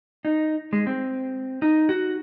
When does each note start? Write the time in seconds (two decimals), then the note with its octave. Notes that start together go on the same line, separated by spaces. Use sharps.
0.25 D#4
0.73 G#3
0.87 C4
1.62 D#4
1.89 F#4